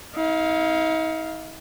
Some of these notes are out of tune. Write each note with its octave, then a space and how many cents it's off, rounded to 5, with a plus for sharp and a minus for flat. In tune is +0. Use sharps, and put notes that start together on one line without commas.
D#4 +45 F5 +0